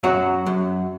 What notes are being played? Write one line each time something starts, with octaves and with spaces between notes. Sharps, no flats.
F#2 F#3 F#4
F#2